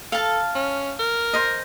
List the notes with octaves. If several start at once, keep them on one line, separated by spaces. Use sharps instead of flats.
A4 F5 A5
C#4
A#4
C5 D#5